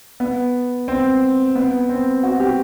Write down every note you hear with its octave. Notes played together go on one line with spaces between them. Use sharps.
B3
C4
B3
C4
F#4
G4